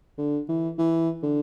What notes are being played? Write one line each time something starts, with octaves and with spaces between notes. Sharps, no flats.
D3
E3
E3
D3